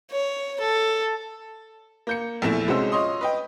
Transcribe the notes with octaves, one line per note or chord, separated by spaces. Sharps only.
C#5
A4
A#3 G6 C#7
A#1 E2 A3 E4 E7
C2 G#3 C#4 F#4 C5 E6
F4 C#5 D#5 C6 D#6
B4 D#5 G5